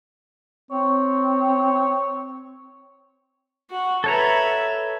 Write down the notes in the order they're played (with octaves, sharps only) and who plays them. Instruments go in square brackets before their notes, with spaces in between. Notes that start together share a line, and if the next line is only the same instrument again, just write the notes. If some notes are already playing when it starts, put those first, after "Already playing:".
[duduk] C4 [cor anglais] C#5
[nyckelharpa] F#4 F#5
[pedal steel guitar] A4 C#5 A#5 [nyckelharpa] B4 E5